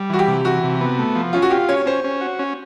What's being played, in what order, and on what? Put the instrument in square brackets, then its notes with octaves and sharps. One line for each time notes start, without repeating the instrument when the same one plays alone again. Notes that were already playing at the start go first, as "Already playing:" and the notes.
Already playing: [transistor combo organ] G3
[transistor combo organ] E3 [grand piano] F#4
[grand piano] G4
[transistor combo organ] C3
[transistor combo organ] E3 [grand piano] F#4
[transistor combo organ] C3
B3
A3
F3
[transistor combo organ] C#4 [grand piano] F4
[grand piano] F#4
[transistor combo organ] F4 [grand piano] G4
[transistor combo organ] C#4 [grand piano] C#5
[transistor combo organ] C#4 [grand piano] C5
[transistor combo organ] C#4
F#4
C#4